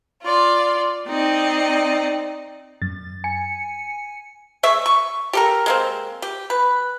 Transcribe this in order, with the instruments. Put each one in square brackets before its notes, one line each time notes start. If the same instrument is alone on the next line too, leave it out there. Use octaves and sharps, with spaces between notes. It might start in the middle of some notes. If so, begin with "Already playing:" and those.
[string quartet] F4 D5
C4 D#4 D5 D#5
[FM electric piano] F#2 A6
G#5 C#7
[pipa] G#3 E5 C#6
C#6
G4 A4 A#4
G#3 A#3 C4
G4
B4